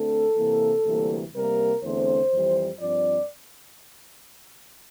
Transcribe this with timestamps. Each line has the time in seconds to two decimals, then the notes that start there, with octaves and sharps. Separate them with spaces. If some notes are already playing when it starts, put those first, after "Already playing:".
Already playing: D2 D3 A3 C4 A4
0.36 C3 E3 A#3
0.85 D2 C3 E3 G3 A#3
1.33 C3 G3 A#3 A#4
1.82 E2 D3 A3 C4 C5
2.31 F2 E3 G3
2.80 G2 F3 C4 D5